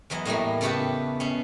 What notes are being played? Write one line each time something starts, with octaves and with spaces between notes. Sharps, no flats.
E2 E3 F#3 D#5
A2 G3 A3 A#3
C#3 A3 B3 F#4 G4 A4
B2 C#4